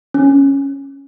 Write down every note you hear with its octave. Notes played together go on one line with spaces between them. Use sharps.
C#4